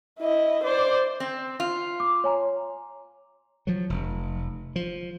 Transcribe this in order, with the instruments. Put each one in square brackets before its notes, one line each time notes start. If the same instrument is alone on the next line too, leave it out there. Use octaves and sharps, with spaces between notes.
[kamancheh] E4 D#5
C5 D5
[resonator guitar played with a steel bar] C4
F4
[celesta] D6
C#5 G#5 A#5
[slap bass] F3 F#3
F1
F3